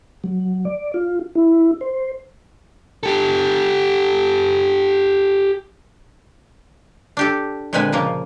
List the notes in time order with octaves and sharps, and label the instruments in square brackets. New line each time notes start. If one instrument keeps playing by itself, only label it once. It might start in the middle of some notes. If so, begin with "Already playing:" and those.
[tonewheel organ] F#3
D5
F4
E4
C5
[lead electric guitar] G4 A4
[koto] D4 G4 A4
A#2 D3 G#3 C4 B4 G#5
C#3 F3 A#3